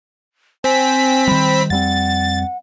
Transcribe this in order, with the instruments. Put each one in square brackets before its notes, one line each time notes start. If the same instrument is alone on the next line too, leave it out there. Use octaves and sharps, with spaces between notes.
[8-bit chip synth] C4 B6 [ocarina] G#5
[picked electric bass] D#3 G3 [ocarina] B5
[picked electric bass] F2 G3 C4 [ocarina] F#5 [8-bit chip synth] A6